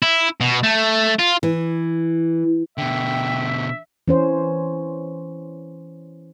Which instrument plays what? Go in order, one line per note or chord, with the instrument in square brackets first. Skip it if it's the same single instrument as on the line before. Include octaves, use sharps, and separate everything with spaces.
[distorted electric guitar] E4
B2
A3
F4
[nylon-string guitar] E3
[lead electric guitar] B2 D3 [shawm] E5 [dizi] G5
[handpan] E3 C#4 C5